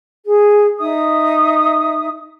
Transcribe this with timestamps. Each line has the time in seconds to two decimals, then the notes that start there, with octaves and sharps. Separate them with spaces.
0.24 G#4
0.79 D#4 E5 D#6